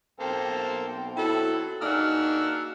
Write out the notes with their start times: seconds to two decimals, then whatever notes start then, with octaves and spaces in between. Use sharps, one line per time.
0.20 B1 A#3 C4 A4 C5 G5
1.17 F#3 E4 A4
1.82 A#3 D4 D#4 F#4 G#4 E6 F6